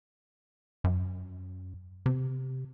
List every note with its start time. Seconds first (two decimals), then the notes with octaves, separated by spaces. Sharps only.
0.84 F#2
2.06 C3